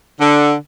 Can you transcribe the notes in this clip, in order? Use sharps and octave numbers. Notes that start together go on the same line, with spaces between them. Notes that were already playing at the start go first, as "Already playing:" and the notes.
D3